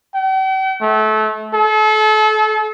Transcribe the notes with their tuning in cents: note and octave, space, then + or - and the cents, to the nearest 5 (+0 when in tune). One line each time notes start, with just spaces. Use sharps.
G5 -45
A3 -25
A4 -35